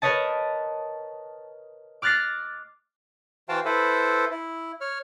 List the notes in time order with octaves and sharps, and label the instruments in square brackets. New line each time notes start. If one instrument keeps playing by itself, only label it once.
[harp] A#4 B4 C#5 D#5 A5
D6 F6 F#6 A6 A#6 C7
[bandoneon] E3 F#4 C5 F5 G5 A5
E4 A4 B4 C5
E4
C#5 F6